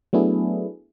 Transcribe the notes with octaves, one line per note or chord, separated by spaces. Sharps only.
F#3 A3 B3 D4 E4 G#4